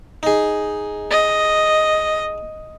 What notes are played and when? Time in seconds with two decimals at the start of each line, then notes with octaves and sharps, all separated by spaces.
0.23 D#4 G#4
1.11 D#5